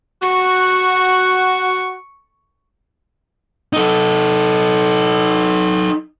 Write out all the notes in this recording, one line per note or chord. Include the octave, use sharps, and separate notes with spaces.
F#4 C#6
D#4 A4